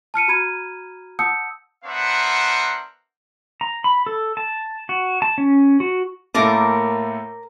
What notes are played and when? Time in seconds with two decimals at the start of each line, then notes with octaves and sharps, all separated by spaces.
0.14 A5 F6 C#7 D#7
0.28 F#4 A#5 B5 F6 G#6 D#7
1.19 F#5 A5 D#6 E6 G6 C#7
1.85 B3 D4 A#4 C5 E5 F#5
3.61 A#5
3.84 B5
4.06 A4
4.37 A5
4.89 F#4
5.22 A5
5.38 C#4
5.80 F#4
6.35 A2 A3 A#3 A#4 A5 D6